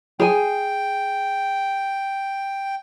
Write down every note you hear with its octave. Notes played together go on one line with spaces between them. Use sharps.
G#4 G5 G#5